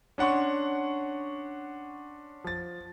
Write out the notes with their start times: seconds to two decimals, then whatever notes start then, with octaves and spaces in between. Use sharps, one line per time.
0.18 C#4 D4 F#5 C6 C#6
2.44 F3 A6